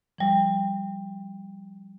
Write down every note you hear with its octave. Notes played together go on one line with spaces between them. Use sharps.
F3 G3